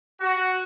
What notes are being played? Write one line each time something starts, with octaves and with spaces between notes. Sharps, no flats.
F#4